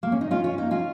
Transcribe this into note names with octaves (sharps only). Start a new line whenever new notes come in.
A#3
C#4
D#4
C#4 F4
C#4 F4
A#3 D#4
C#4 F4